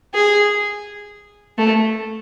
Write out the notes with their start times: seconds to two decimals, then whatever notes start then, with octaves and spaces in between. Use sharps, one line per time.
0.14 G#4
1.58 A3